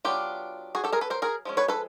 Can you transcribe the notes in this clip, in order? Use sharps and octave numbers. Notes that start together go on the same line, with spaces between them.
F#3 B3 D4 F4 G4
F#4 G#4
G4 A4
G#4 A#4
A4 B4
A#4 C5
G#4 A#4
F3 G#3 C#4
B4 C#5
A4 B4